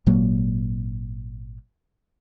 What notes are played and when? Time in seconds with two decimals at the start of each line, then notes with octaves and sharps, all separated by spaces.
0.06 G#1 A#2 F#3 A#3